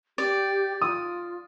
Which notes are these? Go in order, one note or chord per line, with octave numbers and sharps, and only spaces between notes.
G4 D5
F4 D#6